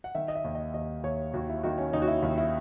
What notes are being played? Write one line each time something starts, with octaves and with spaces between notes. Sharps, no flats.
F#5
D#3 E5
D#5
E5
D#2
D#5
D#2 D#5
D#2 C#5
D#2 F#4
E4
D#3 F#4
C#4
D#2 D#4
F#4
E4
D#2 E4
E4